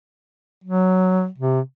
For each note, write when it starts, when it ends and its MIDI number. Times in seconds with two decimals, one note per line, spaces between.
0.64 1.27 54
1.38 1.61 48